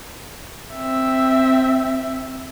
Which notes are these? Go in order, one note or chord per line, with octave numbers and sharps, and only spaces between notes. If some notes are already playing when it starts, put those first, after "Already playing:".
C4 E5